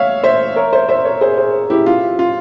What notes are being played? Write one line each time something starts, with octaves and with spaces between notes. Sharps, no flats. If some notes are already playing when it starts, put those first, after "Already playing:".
Already playing: C#5 E5 F5
C5 E5
A#4 C#5
C5 E5
C5 E5
A#4 C#5
G#4 C5
G#4 C5
E4 G4
F4
F4